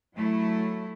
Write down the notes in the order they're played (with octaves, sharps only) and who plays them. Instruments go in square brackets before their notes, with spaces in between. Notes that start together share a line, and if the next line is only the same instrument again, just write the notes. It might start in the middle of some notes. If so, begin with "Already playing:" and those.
[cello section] F#3 A3 E4